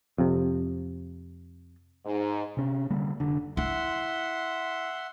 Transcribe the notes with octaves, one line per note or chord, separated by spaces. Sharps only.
F2 C3
G#2
C3 C#4
D3 G3 A#3
F1 D3
E4 E5 F#5 C6